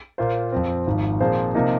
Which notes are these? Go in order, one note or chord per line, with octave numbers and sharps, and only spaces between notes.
A#2 A#3 F4 C5
F2 F3 C4
G#1 G#2 F3
A#2 F3 C4 G#4 C5
C3 F3 A#3 D#4